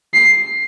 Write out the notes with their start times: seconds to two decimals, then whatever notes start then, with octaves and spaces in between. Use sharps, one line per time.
0.14 C7